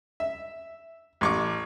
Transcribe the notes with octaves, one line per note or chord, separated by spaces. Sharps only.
E5
A1 C#6 D6